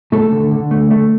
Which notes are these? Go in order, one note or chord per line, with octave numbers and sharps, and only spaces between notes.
A3 A4
D3
D3
A3
A3